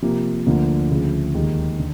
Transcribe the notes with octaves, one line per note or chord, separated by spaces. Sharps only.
C3 F3 A#3
D2 D3 F3 A#3
D2 C#3 F3
D#2 D#3 G#3
D3